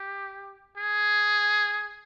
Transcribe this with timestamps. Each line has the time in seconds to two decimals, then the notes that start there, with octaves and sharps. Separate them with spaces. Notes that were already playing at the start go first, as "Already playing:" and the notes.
Already playing: G4
0.77 G#4